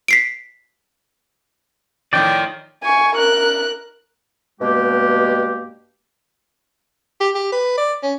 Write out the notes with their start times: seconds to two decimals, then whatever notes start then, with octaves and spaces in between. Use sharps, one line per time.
0.08 B6 C7 D7
2.13 A2 D#3 F3 D5 G5
2.83 G#5 C#6
3.16 A#4 F#6
4.61 G2 B2 G#3 A#3 G4
7.20 G4
7.35 G4
7.52 B4
7.77 D5
8.03 C#4